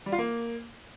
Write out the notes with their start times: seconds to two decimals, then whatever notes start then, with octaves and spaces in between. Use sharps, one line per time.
0.06 G3
0.12 F4
0.18 A#3